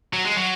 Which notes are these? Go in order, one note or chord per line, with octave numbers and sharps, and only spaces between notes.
F#3
G#3
F#3